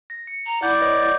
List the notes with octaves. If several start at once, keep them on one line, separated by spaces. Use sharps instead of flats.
A#6
C#7
A#5
E4 D5 F#5 G6
B4 C#5 D#5
D#5 G6